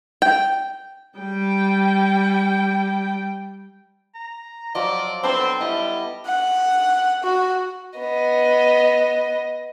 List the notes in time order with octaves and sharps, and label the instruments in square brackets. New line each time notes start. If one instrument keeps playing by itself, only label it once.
[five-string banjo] G5
[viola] G3 G5
[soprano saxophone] A#5
[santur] F3 F#3 [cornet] D5 [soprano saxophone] D#5
[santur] B3 D4 A4 [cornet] C4 [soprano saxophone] C5
[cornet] G3 [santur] E4 [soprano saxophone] D#5
[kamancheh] F#5
F#4
[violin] B3 D#5